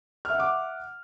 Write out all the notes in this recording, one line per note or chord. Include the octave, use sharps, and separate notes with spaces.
E5 F#5 D6 F6